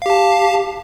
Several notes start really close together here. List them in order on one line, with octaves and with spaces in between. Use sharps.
F5 G4 A5